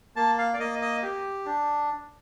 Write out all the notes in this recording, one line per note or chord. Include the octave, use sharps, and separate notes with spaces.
A#3 A5
F5
D5
A#3 D#5
D#5
G4
D4